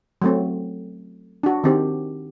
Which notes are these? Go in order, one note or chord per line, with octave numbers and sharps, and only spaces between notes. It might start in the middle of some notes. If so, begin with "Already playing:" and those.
F#3 A3 C4
D4 F#4
D#3 C4 G4